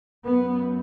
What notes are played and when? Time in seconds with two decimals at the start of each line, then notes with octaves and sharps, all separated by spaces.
0.25 F#2 B3